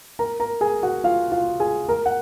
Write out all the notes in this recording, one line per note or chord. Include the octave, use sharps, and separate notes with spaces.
A#4 A#5
A#4 A#5
G#4 G#5
F#4 F#5
F4 F5
F4 F5
G#4 G#5
A#4 A#5
F#5